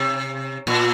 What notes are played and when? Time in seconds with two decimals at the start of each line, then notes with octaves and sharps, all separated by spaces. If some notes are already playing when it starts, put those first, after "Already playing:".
Already playing: C3
0.67 A#2